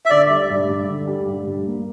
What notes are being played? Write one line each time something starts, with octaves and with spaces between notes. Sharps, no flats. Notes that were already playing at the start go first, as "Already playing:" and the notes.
E5
D3 D5
G3
G2
G2
D3
G3
G2
G2
A#3